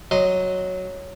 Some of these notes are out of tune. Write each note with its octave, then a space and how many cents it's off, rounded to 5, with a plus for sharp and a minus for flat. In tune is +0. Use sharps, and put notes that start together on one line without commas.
F#3 +0 D#5 +0 C6 +0